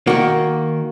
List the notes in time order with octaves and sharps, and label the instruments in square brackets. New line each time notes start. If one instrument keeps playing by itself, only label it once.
[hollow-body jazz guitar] D#3 A#3 F#4